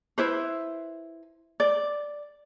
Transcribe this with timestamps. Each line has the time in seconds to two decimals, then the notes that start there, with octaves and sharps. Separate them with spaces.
0.18 E4 B4 C5
1.60 D5